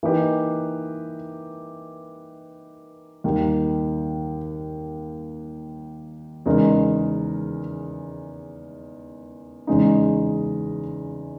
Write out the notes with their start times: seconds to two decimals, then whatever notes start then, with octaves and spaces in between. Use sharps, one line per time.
0.03 E3 A#3 D#4 G4 B4
3.24 D#2 D#3 G3
6.46 E2 C#3 G#3 D#4 A#4
9.67 E2 C#3 G#3 D#4